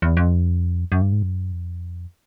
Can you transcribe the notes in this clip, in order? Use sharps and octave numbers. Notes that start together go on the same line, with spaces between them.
E2
F2
F#2
G2
G#2
F#2
F2